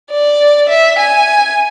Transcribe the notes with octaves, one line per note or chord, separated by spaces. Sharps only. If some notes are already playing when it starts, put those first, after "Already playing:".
D5
E5
G#5